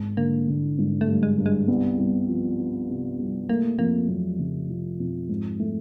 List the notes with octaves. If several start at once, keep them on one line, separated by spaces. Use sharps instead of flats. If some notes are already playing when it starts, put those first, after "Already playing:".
Already playing: G#1
D3 A#3
D3
G#1
A3
G2
G#3
G2
G#3
C2 B3
C2
F3
F3
C3
C2
A3 A#3
F2 A#3
F2 F#3
F2 C#3
C3 F3
F2 B2
G#2
A3